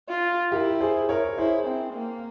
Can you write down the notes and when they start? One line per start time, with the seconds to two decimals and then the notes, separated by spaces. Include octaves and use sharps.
0.09 F4
0.52 E4 G4 A#4
0.80 G#4 C5
1.09 A#4 C#5
1.37 E4 G#4 C5
1.67 C4
1.95 A#3